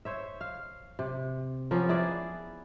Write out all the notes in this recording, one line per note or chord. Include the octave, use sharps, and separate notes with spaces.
C5 C#5 E5
F5
C3
F3 A#3 B3 C#4
E4 G#4 B4 D5